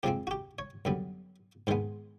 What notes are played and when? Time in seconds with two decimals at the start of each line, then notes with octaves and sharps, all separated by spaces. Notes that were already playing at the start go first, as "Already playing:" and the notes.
0.03 F2 C3 F3 G#3 C4 G4
0.27 F#4
0.31 G4
0.59 C#5
0.85 F#2 D3 G3 B3
1.67 G#2 D#3 G#3 B3 C5